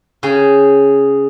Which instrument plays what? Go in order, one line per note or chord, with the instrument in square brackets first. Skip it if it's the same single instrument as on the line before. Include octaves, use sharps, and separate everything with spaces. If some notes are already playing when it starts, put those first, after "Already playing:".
[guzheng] C#3 G#4 G5